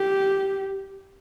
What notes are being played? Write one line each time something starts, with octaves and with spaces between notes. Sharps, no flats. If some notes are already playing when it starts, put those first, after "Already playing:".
Already playing: G4